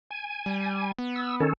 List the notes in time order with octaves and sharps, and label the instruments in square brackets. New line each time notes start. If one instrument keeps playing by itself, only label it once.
[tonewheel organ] G#5
[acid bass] G3
B3
[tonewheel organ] E6
D#3 C#4 A4